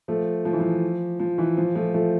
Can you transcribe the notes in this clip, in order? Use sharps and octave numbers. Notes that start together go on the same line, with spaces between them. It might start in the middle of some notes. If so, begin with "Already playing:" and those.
F3 A3
F3
E3
F3
F3
E3
F3
F3 A3
F3 A3